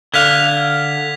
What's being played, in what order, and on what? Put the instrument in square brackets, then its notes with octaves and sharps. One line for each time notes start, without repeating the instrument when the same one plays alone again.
[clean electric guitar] D3 F5 [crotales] G#6 B6 F7